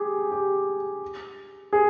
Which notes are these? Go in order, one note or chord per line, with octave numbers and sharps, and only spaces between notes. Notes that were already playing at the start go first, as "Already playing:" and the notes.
Already playing: G4 G#4
G4
G#4